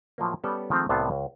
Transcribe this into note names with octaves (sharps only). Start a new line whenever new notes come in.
A2 F3 F#3 A#3
G3 B3 C#4 G4 A4 D5
D#3 F3 G#3 A3 C4
C2 A2 C3 B3 F5 A5
C#2